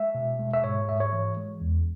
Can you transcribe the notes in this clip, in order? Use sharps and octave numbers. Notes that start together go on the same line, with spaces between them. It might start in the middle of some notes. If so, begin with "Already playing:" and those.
Already playing: G#3 E5
B2
G#3
E5
G#2 C#5
G#2 E5
C#5
E3
G#3
E2